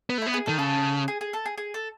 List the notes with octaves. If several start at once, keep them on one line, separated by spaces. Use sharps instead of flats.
B3
A3
B3 E4
G#4
D#3 A4
C#3 A4
G#4
G#4
A4
G#4
G#4
A4